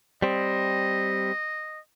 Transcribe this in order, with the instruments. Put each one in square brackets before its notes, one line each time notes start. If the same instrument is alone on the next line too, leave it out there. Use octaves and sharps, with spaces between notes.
[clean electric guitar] G3 C4 [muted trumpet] D#5